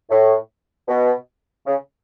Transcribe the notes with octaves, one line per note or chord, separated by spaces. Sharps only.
A2
B2
C#3